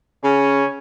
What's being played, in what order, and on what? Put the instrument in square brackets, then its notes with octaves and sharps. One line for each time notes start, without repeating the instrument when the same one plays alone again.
[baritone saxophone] C#3 [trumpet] C#4